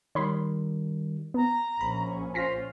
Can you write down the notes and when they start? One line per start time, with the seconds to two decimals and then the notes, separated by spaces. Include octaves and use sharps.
0.15 D#3 G3 C#5 B5 C6
1.34 B3 A#5
1.81 A#1 A#2 C#4 B5
2.34 F4 C5 G#5 A#6 B6